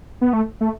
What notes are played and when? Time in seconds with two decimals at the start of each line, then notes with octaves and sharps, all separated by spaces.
0.21 B3
0.33 A3
0.61 A3